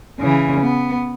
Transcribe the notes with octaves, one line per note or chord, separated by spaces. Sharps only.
C#3 E3
B3